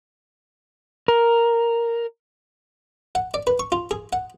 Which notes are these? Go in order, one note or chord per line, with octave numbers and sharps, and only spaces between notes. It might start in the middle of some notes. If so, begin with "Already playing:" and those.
A#4
F#5
D5
B4
C#6
F4
G#4
F#5